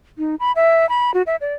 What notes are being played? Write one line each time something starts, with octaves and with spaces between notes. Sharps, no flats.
D#4
B5
E5
B5
F#4
E5
D5